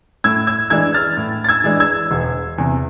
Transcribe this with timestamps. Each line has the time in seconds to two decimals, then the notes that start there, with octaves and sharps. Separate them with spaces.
0.24 A2 E6 G#6
0.47 E6 G#6
0.70 E3 G#3 D4 E6 G#6
0.94 F6 A6
1.17 A2
1.44 A6
1.48 E6 G#6
1.64 E3 G#3 D4
1.80 E6 G#6
2.11 E1
2.58 E2 C3